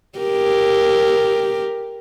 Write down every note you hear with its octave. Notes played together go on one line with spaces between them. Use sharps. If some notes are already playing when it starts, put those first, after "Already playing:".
G4 A#4